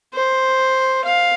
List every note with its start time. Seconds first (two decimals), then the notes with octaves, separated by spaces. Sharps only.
0.15 C5
1.05 F5